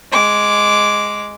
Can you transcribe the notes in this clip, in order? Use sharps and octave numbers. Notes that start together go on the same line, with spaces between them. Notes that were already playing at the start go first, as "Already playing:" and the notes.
G#3 D6